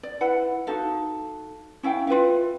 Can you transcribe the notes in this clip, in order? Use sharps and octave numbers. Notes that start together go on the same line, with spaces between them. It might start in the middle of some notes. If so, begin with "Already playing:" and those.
D5
E4 B4 F#5
D#4 F#4 A4 F5
C#4 E4 F5 G5
F4 B4 E5 F5